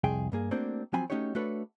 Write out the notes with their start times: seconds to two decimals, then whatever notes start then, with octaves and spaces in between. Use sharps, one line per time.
0.04 C2 F2 G#4 G5
0.32 G2 A#3 G#4
0.51 A3 A#3 C4 D4 F#4 C5
0.93 F3 F#3 C4 G#5 B5
1.10 A3 C#4 D#4 F#4 G4 C#5
1.35 A3 D4 F#4 A4 B4 C#5